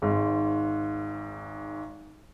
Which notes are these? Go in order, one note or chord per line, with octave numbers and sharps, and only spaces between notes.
G#1 G#2